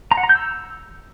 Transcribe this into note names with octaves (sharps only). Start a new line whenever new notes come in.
A#5
F#5
A#5
G6
E6